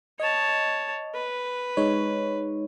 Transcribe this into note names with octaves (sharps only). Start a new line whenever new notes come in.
C#5 D#5 A5
B4
G#3 D#4 C#5